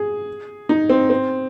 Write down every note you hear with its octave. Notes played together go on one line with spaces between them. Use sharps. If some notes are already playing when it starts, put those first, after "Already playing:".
Already playing: G#4
D#4
C4
C4